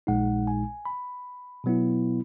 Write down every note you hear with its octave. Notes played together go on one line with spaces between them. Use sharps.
A#1 A#2 G#3 D#4 F#5
G#5
B5
B2 F#3 B3 E4